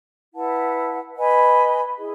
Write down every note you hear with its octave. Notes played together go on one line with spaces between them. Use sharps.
E4 B4 F#5 A5
B4 D#5 G#5 B5
E4 G#4